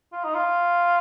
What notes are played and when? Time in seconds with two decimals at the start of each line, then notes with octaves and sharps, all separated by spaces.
0.13 F4
0.24 D#4
0.35 F4